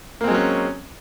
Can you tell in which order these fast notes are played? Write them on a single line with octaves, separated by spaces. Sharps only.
A#3 C4 G#3 F#3 C#4